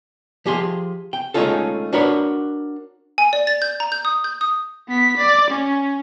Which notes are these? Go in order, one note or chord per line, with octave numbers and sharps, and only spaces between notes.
F3 G4 G#4 C6
G5
G#3 A3 C#4 D#4 F4 A4
D4 F#4 A#4 B4 C#5
G#5
D5
A6
G6
A#5
G6
D#6
G6
D#6
B3 B6
D5
C#4